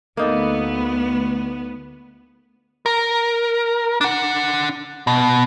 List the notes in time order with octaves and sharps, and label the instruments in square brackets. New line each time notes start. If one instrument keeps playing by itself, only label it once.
[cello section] D2 B3 [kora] A#3 D#4 A4
[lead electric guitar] A#4
D4 F#5
B2